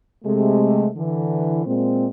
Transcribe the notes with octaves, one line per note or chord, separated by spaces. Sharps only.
C3 G#3 A3
D3 E3
A#2 G#3 C4